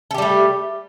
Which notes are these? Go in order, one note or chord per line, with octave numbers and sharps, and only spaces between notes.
G3 A3 G4 A4